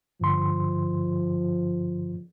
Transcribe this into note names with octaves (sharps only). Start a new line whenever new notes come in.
G2 D3 F3 C6